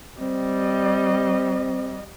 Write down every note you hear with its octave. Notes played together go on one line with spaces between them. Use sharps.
G3 C4 D#5